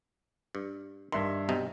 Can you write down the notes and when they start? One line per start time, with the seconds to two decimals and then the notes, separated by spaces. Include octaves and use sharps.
0.55 G2
1.12 G2 D#3 E5 C6
1.49 B1 C3 D#4